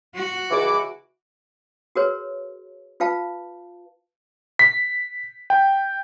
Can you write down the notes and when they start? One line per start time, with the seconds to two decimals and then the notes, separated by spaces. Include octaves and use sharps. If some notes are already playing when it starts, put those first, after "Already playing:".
0.15 F#4
0.50 C#2 E3 D6
1.96 F#4 G#4 A#4 B4 C#5
3.00 F4 B4 F5 A5
4.59 B6
5.50 G5